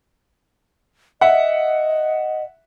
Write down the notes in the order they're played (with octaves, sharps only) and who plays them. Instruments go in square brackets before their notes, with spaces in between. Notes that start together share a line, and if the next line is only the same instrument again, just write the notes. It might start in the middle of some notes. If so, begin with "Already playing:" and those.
[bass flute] D#5 [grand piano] E5 F#5